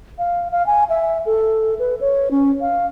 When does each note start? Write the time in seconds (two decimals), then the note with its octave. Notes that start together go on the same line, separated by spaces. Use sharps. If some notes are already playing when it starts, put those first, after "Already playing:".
0.18 F5
0.51 F5
0.66 G#5
0.89 E5
1.26 A4
1.79 B4
2.01 C#5
2.31 C#4
2.61 F5